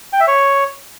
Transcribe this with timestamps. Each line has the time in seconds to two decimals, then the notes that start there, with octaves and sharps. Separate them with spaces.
0.13 G5
0.20 E5
0.27 C#5